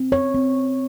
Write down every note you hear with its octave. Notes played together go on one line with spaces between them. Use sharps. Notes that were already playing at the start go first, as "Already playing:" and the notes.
Already playing: C4
C#5
C4